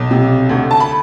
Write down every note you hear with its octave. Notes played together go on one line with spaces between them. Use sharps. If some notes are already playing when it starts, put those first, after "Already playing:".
Already playing: B1
C3
D2
A5
B5